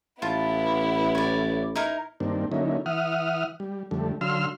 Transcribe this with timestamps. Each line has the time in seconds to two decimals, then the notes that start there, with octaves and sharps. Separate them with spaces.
0.22 A1 B3 E4 F4 A5
1.15 C#5 D5
1.76 D#4 E4 A#4
2.20 G2 D#3 A#3 C4 D4
2.52 D3 F#3 A#3 C#4 D#4 E4
2.86 E3 E5 F#5 D#6 F6
3.60 G3
3.91 F2 D3 G3 A3
4.21 D3 F#3 F5 C6 E6 F6